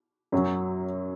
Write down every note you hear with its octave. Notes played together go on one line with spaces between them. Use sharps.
F#2 F#3 C#4